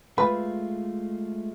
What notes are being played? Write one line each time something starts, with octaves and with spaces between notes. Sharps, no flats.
G#3 A3 F4 B4